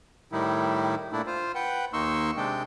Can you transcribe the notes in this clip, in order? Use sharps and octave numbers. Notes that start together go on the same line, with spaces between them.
A2 D#3 G3 D#4 E4
A#2 A3 D4 E4
F4 C5
B4 F#5 G5
D#2 A#3 D#4 C6 C#6 E6
C3 G#3 D4 G5